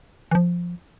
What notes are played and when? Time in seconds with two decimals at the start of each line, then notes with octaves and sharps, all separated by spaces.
0.31 E3
0.35 F3